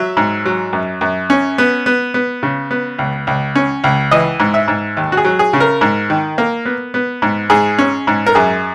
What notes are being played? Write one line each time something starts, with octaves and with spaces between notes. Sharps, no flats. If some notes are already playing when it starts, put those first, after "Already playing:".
Already playing: F#3 E5
G#2
F#3
F#2
F#2
C#4
B3
B3
B3
C#3
B3
C#2
C#2
C#4
C#2
E3 D#5
G#2
E5
G#2
D#2
F#4
G#4
F#3
G#4
C#3
A#4
G#2
D#3
A#3
B3
B3
G#2
G#2 G#4
C#4
G#2
A#4
F#2 G#4